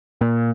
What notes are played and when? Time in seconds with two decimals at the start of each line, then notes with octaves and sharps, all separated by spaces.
0.21 A#2